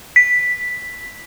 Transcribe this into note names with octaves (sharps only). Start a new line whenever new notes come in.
B6